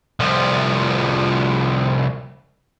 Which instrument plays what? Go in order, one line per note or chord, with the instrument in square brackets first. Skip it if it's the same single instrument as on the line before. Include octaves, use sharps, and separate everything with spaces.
[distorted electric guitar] C2 F3